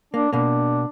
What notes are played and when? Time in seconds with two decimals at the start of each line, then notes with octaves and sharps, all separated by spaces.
0.14 A#3 D4
0.33 B2 A#3 D4